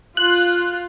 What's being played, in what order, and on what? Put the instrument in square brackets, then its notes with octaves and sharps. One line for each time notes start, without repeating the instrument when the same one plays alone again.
[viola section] F4 [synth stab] F#6